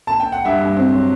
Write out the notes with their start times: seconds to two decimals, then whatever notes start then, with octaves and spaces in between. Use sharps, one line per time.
0.07 A5
0.20 G5
0.32 F#5
0.45 G2 E5
0.61 G2
0.77 C4
0.92 F#3